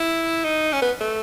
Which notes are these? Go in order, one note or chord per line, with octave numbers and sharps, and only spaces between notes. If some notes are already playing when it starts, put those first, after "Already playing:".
Already playing: E4
D#4
C#4
B3
A3